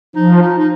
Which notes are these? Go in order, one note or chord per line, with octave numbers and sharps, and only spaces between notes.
F3 D#4
D#4
D#4